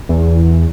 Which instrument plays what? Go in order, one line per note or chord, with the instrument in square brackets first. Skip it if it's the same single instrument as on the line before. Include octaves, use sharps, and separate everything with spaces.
[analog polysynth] E2